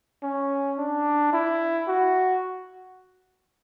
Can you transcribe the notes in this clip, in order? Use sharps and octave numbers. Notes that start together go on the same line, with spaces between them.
C#4
D4
E4
F#4